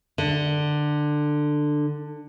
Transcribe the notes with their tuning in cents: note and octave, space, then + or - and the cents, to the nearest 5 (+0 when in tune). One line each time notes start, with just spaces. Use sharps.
D3 +15